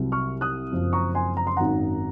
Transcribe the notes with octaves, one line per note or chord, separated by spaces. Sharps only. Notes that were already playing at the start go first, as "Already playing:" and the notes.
Already playing: C2 C3 F#3
C#6 F6
D#6 F#6
F#1 F#2 F3 C4
A#5 C#6
G#5 C6
A#5
C6
G#1 F#2 D#3 F#3 F#5 A#5